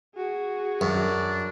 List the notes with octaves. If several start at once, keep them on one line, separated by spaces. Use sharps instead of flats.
F#4 G#4
F#2 D4